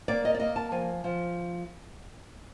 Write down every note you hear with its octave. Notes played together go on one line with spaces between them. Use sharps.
A#3 D5
D#5
D5
A#3 D#5
A5
F3 G#5
F3